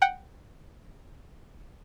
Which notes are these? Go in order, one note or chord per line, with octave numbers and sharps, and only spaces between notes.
F#5 G5